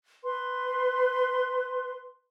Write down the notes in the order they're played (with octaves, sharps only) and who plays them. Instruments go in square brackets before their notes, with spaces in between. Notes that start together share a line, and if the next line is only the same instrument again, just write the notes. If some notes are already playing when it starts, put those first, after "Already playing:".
[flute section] B4 C6